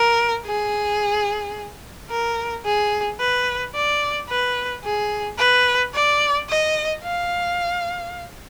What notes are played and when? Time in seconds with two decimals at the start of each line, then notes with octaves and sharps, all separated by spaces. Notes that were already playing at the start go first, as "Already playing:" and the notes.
Already playing: A#4
0.46 G#4
2.10 A#4
2.65 G#4
3.20 B4
3.75 D5
4.29 B4
4.84 G#4
5.39 B4
5.94 D5
6.49 D#5
7.03 F5